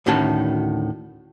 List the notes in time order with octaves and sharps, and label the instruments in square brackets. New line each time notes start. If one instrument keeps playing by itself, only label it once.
[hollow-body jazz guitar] D2 A2 D#3 C#4 F#4 A5